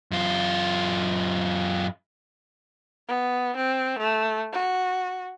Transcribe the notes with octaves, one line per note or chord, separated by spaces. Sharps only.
F#2 F4
B3
C4
A3
F#4